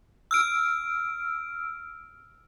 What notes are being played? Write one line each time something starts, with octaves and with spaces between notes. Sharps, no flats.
E6 F6 D7